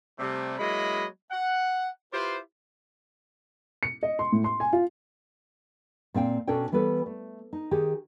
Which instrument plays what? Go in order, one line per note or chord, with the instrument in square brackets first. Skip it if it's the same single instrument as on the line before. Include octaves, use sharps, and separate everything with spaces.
[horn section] C3 G3 A3
F#3 G#3 A#3 E4 D#5 B5
F#5
E4 F4 G4 B4 C5
[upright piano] C#7
D#5
C6
A2
C6
G#5
F4
[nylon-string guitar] A#2 C4 F5 G5
B2 C#4 D4 A4 C#5 G5
E3 G3 B3 A4 B4
A3
D#4
D#3 G4 G#4